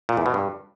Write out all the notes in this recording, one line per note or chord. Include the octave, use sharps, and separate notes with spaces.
A#2
E2
B2
G2